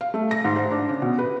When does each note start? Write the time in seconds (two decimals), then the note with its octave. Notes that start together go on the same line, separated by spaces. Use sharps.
0.01 F5
0.14 A3
0.31 A#6
0.45 G#2
0.56 C5
0.72 D4
0.89 C#3
1.02 B2
1.19 B4